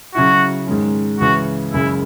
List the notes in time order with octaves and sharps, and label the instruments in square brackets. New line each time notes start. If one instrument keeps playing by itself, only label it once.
[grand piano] C#3 F#3 C#4 E4 [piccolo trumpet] F#4
[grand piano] G#2 D#3 G#3 C#4
[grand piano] C#2 C#3 E3 [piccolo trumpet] F#4
[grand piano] F#1 F#2 C#3 G#3 [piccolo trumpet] E4